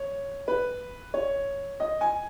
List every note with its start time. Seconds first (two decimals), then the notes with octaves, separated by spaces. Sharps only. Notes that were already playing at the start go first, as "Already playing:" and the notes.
Already playing: C#5
0.48 B4
1.14 C#5
1.80 D#5
2.01 G#5